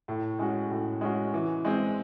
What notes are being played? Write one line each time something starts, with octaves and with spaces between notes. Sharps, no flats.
A2
G#3 C#4 F#4
A2
G#3 C#4 F#4
E3
G#3 C4